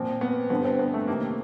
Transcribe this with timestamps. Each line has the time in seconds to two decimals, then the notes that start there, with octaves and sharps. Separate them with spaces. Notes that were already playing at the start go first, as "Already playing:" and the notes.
Already playing: A#2 F3 C4
0.21 B3
0.50 G2 D3 F3 B3
0.65 C4
0.79 B3
0.94 A3
1.07 F2 C3 D#3 A#3